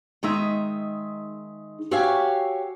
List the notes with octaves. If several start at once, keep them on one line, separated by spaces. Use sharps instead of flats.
D#3 G#3 D#4 E5
F#4 G4 C#5 E5 F5 G#5